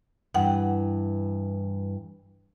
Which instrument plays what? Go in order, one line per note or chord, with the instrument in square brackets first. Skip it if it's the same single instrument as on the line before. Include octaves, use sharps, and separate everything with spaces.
[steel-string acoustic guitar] G2 E3 [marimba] F#5 G5